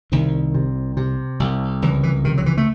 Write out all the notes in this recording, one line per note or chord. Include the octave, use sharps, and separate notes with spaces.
C2 D#3
C3
C3
C2
C#2 E3
E3
C3 D#3
F#3
E3
A3